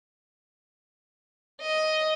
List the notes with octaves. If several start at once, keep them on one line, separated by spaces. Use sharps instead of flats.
D#5